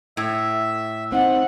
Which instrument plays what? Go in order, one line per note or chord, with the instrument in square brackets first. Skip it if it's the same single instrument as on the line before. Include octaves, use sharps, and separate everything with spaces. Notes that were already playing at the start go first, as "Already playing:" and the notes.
[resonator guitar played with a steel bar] A2 [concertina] E5
[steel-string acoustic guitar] C4 D#4 [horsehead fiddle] F#5